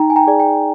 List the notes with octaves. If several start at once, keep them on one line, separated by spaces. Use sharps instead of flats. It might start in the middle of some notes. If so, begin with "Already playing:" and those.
Already playing: D#4 G5 A#5
G#5
G5 A#5
G#4 D5
G5